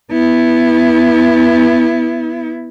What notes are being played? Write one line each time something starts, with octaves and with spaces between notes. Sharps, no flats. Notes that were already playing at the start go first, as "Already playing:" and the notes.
B3 E4